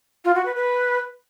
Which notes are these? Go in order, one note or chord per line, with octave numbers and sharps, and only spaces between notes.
F4
F#4
B4
B4